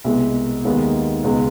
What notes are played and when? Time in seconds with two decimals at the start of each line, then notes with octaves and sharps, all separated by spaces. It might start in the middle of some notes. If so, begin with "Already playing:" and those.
0.04 C2 B2 G#3
0.64 D#2 D#3 G#3 B3 D#4
1.24 C#2 B2 G#3